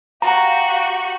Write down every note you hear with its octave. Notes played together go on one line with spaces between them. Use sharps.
F#4 G4 F5 A#5